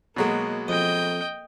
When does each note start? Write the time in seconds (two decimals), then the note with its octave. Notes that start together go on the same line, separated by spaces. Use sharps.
0.16 B2 F#3 G#3 A#3
0.68 F2 D#5 G5